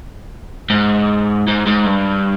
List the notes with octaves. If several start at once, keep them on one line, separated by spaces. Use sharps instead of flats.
G#2
G#2
G#2
G2